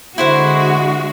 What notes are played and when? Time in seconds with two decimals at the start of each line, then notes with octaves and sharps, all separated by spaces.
0.18 D3 G#3 E4 F#4 C5 F#5